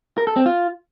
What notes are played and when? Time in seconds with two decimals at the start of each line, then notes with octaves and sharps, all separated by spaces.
0.18 A#4
0.27 A4
0.36 C4
0.46 F4